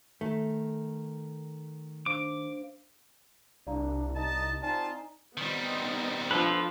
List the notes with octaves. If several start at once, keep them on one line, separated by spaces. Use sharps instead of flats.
D#3 A3
D4 C5 F5 D6
C2 D4 D5 F5 A#5
D#4 D#5 A5
C3 D#4 F4 D5 G#5 A5
D#3 G3 B3 C4 D#4
F3 D4 F4 A4 B4